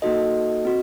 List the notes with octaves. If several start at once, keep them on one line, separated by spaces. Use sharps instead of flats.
A#3 D#4 F#4 A4 D#5
C4 F#4